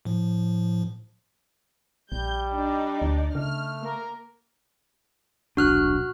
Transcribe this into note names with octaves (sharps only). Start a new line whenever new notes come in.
A2 F3
A#1 G3 G6
D4 D#4 D5
D2
C#3 A3 F6
A#3 A#4
D#1 B1 D4 F#4 F6 F#6